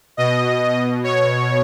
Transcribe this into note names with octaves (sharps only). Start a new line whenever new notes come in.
B2 D#5
C#5